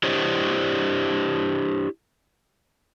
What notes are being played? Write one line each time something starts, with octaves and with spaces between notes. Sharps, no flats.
D4 E4 G4 C5 C#5 D#5